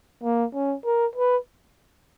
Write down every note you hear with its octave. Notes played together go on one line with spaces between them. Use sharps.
A#3
C#4
A#4
B4